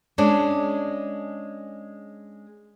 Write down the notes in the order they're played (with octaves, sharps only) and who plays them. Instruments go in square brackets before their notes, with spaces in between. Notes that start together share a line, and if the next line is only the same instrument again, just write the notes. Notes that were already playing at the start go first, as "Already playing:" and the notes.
[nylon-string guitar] G#3 C#4 D4